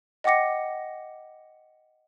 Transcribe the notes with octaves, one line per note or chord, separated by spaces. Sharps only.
D#5 F#5 G5 D6 A#6 C#7